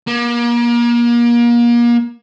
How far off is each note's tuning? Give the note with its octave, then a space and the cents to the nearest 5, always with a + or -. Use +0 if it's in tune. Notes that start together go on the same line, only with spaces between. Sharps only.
A#3 +35